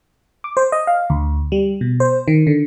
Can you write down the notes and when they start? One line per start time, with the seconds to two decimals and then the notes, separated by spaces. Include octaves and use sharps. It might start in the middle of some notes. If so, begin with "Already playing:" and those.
0.44 D6
0.57 C5
0.72 D#5
0.87 F5
1.10 D2
1.52 G3
1.81 B2
2.00 C5
2.28 D#3
2.47 D3